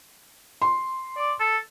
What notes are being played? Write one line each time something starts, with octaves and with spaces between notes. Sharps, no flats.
C6
D5
A4